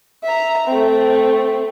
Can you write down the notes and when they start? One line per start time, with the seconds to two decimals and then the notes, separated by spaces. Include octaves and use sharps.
0.24 E5 A#5
0.68 A3 C4